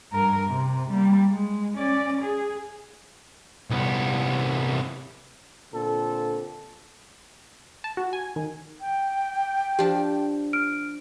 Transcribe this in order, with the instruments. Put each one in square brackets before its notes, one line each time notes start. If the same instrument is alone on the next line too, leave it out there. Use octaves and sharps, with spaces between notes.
[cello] G2 A#4
C3
G3 A#3
G#3
C#4 D5
G#4
[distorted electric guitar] C2 B3
[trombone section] A#2 D3 C4 A4
[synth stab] A5
F#4
G#5
D#3
[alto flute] G5
[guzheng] F3 D4 [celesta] G4
[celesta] F6 D7